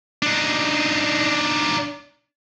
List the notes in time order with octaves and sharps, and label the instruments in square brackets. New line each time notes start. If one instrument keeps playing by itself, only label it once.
[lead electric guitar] D4 D#4